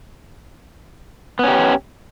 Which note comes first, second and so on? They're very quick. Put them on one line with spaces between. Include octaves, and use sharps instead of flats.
B3 C#4 G4